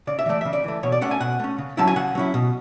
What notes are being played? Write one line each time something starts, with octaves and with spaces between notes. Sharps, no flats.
C#3 D5
E5
E3 A3 D5
C#3 E5
D5
E3 A3
B2 C#5
D5
A3 C#4 F#5
G#5
B2 F#5
A3 C#4
C#3
F#3 C#4 E4 A5
G#5
C#3 F#5
F#3 C#4 E4
B2